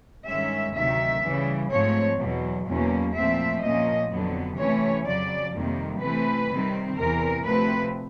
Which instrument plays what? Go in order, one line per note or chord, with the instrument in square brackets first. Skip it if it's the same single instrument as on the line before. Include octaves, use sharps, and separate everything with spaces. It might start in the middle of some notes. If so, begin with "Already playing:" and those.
[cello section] G2 D#3 G#3 C#4 E5
D2 C3 D#3 F#3 E5
C#3 E3 G3
G#2 F3 A3 C4 C#5
E2 B2 F#3
E2 B2 F#3 A#3 C#4
A#2 F3 A3 C4 E5
A#2 F3 A#3 C#4 D#5
F2 D3 F#3 B3
C3 E3 A3 C#4 C#5
F2 C#3 F#3 D5
F2 C3 D#3 G3 A#3
C3 E3 A3 C4 B4
C3 D#3 G3 C4
E2 C3 E3 A#4
D2 C3 F3 A3 C4 B4